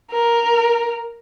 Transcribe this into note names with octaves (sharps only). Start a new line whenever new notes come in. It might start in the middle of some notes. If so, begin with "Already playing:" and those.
A#4